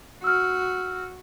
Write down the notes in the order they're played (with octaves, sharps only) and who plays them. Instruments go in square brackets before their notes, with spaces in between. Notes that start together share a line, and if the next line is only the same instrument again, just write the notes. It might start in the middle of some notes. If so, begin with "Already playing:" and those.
[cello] F#4 [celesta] E6 F6